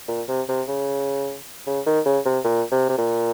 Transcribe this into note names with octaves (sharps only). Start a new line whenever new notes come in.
A#2
C3
C3
C#3
C#3
D#3
C#3
C3
A#2
C3
C3
A#2